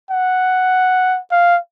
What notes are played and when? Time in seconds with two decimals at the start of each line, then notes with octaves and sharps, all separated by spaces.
0.10 F#5
1.31 F5